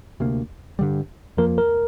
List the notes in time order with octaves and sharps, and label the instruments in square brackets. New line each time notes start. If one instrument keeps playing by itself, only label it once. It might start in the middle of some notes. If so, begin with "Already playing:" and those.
[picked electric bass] D2 C3 A#3
G2 D3 G3
[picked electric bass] F2 F3 A#3 [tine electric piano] A#4
[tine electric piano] A#4